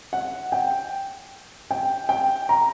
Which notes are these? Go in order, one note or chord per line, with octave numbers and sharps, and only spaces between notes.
F#5
G5
G5
G5
A#5